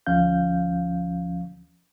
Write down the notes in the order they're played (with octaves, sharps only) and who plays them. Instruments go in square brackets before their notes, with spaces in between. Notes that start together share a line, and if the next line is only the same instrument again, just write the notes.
[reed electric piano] D2 F3 C#4 F5 G6